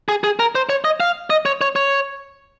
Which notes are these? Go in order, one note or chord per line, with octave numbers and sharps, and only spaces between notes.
G#4
G#4
A#4
C5
C#5
D#5
F5
D#5
C#5
C#5
C#5